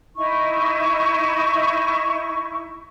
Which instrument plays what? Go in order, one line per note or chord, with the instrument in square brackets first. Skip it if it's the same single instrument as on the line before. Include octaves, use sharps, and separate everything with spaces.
[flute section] D#4 E4 C#6